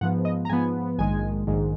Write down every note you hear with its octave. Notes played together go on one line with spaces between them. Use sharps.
G#2 F3 B3 F#5
D#5
A#5
G#2 F3 B3 G#5
A#1 G#2 D#3 G#3 G#5
A#1 G#2 D#3 G#3